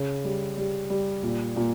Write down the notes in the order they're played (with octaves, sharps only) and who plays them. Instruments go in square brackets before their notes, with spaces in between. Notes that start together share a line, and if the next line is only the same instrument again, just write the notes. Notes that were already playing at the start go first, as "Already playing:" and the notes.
Already playing: [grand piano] C#3
G3
G3
G3
A#2
A#2